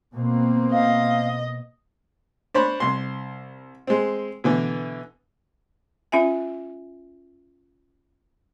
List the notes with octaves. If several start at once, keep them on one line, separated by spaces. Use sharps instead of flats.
B2 A#3 C4
D#5 F5
D4 C5 C#5 B5
C2 C6
G#3 C4
B2 D3 E3
C#4 F4 E5 G#5